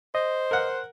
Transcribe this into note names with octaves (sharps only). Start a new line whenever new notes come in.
C5 D#5
A#4 F#5